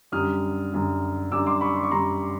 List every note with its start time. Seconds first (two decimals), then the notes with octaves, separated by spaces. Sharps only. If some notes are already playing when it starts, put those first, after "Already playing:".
0.12 F#2 D3 G3 D#6 F6
0.72 F#2 D3 G3
1.32 F#2 D3 G3 D6 E6
1.46 C6 D6
1.61 B5 C#6
1.76 C6
1.83 C#6
1.91 F#2 D3 G3 A#5 C6